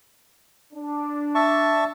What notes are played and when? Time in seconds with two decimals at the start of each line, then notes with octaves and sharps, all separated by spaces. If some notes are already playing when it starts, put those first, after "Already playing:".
0.73 D4
1.35 E5 A5 C#6